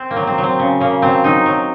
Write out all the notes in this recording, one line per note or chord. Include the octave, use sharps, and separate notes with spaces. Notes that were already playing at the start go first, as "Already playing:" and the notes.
Already playing: C4
A#3
F#3
C4
F#3
C4
C#3
C#3 A#3
F#3 C4
F#3 D#4
F#3